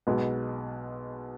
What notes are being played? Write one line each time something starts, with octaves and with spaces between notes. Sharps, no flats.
B1 B2 G#3 B3